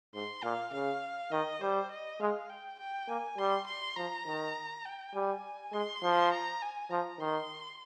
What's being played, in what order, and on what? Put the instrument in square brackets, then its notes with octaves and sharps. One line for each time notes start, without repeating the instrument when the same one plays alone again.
[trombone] G#2 [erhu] C6
[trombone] A#2 [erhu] F5
[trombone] C#3 [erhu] F5
[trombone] D#3 [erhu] D#5
[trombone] G3 [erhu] C5
[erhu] D#5
[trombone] G#3 [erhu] F5
[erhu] G5
G5
[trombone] A#3 [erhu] G#5
[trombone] G3 [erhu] C6
[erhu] C6
[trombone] F3 [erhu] A#5
[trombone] D#3
[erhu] G5
[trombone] G3 [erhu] G#5
[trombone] G#3 [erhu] C6
[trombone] F3
[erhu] A#5
G#5
[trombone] F3 [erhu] A#5
[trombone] D#3 [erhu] C6